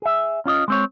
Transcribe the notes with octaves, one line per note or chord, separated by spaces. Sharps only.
G#4 E5
C#4 F4 D5 D#5
G#3 C4 C#5